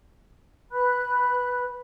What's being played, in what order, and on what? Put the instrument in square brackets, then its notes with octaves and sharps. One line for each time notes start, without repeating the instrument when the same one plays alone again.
[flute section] B4 B5 F#6